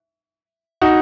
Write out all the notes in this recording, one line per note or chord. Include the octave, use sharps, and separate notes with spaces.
D#4 F#4